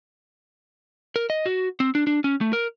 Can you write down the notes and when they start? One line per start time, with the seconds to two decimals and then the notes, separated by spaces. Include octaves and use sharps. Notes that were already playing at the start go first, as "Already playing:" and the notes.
1.16 A#4
1.30 D#5
1.46 F#4
1.80 C4
1.95 D4
2.07 D4
2.24 C#4
2.41 A3
2.53 A#4